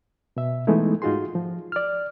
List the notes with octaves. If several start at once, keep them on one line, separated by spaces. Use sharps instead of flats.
B2 E5
E3 G#3 A3 B3 D#4 E4
G#2 D#4 F4 F#4 G#4 C6
F3
D5 F6